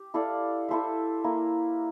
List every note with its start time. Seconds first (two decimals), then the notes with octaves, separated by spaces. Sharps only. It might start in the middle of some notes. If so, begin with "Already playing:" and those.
Already playing: G4
0.14 E4 A4 D5 F5
0.69 E4 A4 C5 E5
1.24 A#3 E4 A#4